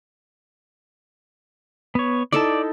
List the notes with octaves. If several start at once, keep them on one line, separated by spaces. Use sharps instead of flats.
B3 C#5
D#4 E4 A4 D5 A5